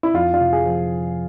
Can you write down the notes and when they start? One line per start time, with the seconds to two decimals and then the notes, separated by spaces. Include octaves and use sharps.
0.03 E4
0.14 F2 F4
0.34 F4
0.40 C3
0.53 G#4
0.65 F3